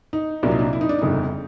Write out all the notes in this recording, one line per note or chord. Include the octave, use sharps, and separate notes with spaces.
D#4
C2 A#2 F#3 D4
D#4
D4
E4
D#4
D4
G1 F2 C#3 D#4